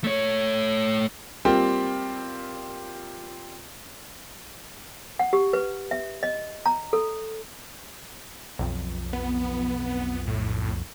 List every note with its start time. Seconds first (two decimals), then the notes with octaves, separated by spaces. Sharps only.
0.04 A3 C#5
1.45 G3 A#3 C4 F4 G4
5.19 F#5
5.33 G4
5.53 B4
5.91 E5
6.23 D#5
6.66 A#5
6.93 A4
8.59 B1 F2
9.13 B3
10.27 A2